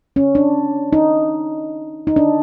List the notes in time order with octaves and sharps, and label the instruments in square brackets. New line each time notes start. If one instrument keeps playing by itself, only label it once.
[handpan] C#4
D4
D#4
D#4
D4